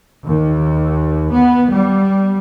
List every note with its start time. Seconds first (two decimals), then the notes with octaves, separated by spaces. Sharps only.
0.25 D#2
1.32 B3
1.70 G3